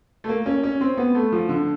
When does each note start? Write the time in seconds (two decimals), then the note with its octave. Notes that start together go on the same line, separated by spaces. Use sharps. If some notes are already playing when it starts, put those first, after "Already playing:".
0.24 A3
0.29 A#3
0.46 C#4
0.63 C#4
0.81 C4
0.97 B3
1.15 A3
1.32 F3
1.49 D3